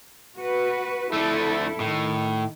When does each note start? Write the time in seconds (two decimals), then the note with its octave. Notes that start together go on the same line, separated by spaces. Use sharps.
0.38 F#4 B4
1.13 F2 A3 D4 E4 A4
1.80 A2 D#3